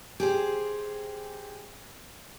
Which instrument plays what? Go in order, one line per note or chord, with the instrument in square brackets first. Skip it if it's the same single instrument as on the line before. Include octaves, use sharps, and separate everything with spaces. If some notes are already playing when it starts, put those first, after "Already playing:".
[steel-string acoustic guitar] G4 G#4 C5